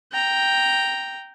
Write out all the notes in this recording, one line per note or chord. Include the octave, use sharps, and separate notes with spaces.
G5 A#5